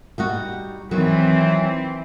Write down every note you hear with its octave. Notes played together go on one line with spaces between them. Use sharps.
G3 D#4 F#4
D#3 E3 F#3 C4